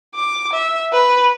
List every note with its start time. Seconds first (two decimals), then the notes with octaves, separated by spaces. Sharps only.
0.15 D6
0.53 E5
0.93 B4